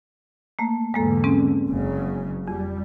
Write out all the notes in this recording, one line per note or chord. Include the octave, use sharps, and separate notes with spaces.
A3 A#3
E2 G#2 D3 G#3 A#3 A4
G#3 C4 C#4
F#1 C#3 F#3
F2 G3